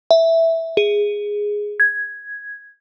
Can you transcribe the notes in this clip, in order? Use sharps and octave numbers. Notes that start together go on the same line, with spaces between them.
E5
G#4
G#6